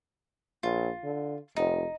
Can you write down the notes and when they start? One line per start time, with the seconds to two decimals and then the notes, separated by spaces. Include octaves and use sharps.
0.63 A#1 F4
1.04 D3
1.56 F1 D#4